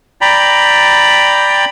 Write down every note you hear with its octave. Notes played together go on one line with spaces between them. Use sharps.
D5 G5 A#5 B5